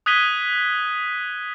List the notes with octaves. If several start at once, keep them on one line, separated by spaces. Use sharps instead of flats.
D#6 F#6 G#6 B6 D#7 G7